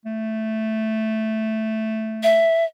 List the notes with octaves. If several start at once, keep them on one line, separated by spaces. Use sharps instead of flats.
A3
E5